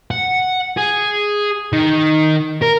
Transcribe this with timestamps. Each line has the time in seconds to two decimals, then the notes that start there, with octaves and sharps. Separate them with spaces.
0.11 F#5
0.77 G#4
1.73 D#3
2.62 A#4